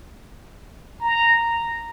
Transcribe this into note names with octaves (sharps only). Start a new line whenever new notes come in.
A#5